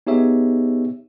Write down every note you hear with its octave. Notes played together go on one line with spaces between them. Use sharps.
B3 D#4 G4 G#4 C#5 E5